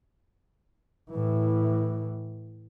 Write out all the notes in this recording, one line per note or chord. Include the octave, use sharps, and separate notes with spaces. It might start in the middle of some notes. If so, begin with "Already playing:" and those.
A2 E3